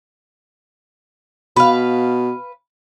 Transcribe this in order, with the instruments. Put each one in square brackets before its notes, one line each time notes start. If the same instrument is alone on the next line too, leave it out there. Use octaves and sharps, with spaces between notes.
[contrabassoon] B2 [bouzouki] B4 F5